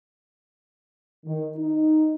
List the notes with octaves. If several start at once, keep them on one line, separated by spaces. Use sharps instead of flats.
D#3
D#4